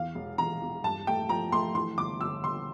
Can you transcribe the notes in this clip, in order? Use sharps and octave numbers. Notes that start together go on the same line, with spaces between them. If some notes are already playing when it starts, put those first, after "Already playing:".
Already playing: E2 F5
E1
E2 A#5
E2
G2 A5
A3 G5
F3 A#5
A3 C6
E3 C6
G1 D6
G1 E6
G1 C6